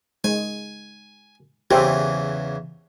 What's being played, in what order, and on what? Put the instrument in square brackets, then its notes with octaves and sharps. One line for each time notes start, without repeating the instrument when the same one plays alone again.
[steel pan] G#3 [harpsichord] G#5
[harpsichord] E2 C#3 E3 [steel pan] G4 C5 E5